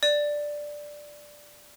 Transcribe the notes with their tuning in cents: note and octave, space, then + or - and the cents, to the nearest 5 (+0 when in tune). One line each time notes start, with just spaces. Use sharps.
D5 +5